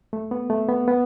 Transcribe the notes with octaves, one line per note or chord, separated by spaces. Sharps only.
A3
B3
A3
B3
B3